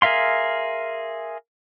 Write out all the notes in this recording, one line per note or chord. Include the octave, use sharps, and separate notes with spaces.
G#4 A#4 E5 F5 C6